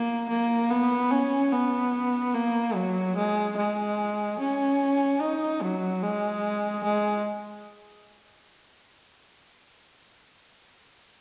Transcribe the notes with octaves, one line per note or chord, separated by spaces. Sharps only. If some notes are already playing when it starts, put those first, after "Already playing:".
Already playing: A#3
A#3
B3
C#4
B3
A#3
F#3
G#3
G#3
C#4
D#4
F#3
G#3
G#3